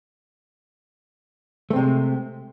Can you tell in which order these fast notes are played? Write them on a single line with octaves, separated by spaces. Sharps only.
A3 C4 C3 G#3